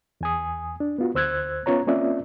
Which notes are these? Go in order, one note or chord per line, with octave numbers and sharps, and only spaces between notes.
E2 G#5 D#6
D4
B3 F4 F#4
D2 C5 E6 F#6 G#6
B3 C#4 F4 C#5 A#5
A#3 C4 C#4 F4 D5 E5